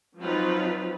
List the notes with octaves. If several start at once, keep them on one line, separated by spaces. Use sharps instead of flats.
F3 F#3 C4 D#4 F4 B4